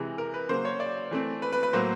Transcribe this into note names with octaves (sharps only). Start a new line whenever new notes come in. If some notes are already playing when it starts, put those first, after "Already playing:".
Already playing: C3 E3 G#3
A#4
B4
C#3 F#3 A#3 C5
C#5
D5
E3 A3 C4
B4
B4
B4
A2 F#3 A#3 C5